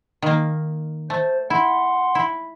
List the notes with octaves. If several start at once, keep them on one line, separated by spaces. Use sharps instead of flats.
D#3 A#3
A3 C5
E4 F#5 C6
E4